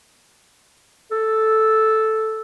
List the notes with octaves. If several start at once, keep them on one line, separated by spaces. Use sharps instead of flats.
A4